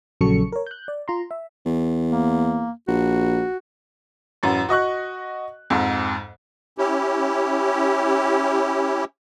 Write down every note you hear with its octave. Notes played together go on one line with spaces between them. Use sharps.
A#1 C#3 F#3 A4 C#6 C#7
A#4 C#5
F#6 G6
D5
F4 A#5 C6
E5
E2
A#3
A#1 F#4
A1 F#2
F#4 D#5 C#6 F#6
F2 G#2
C#4 E4 G4